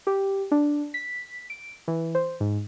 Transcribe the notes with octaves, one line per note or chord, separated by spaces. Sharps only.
G4
D4
B6
D7
E3
C5
G#2